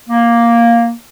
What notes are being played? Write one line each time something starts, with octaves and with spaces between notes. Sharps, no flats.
A#3